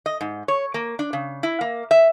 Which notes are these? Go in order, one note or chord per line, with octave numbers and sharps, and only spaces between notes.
D#5
G#2
C#5
A#3
D4
C#3
E4
A#3
E5